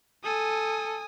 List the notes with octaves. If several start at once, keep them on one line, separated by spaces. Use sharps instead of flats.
A4 G#5 D#6